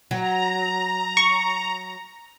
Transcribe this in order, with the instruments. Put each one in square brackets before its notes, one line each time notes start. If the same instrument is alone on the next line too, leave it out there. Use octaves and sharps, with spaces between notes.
[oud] F#3 [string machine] A#5
[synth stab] C#6